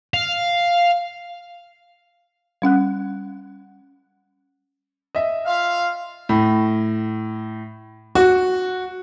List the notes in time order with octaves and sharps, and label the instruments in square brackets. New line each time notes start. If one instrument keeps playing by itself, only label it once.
[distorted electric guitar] F5
[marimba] G3 C#4 F#5 F#6
[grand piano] D#5 E5
[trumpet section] F4 F5
[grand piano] A2
F#4